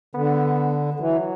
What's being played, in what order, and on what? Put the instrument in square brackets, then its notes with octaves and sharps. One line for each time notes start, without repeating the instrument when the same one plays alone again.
[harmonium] D3 [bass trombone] B3
[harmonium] D3
[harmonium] E3 [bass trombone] F#3